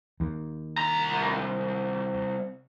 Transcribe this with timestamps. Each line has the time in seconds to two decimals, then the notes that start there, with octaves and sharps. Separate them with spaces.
0.20 D#2
0.78 C2 A#5